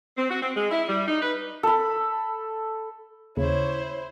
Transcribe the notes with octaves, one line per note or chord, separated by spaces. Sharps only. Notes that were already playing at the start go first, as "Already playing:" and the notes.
C4
F#4
C4
G#3
E4
G3
D#4
B4
A4 B5
D#2 C#3 E4 C5 C#5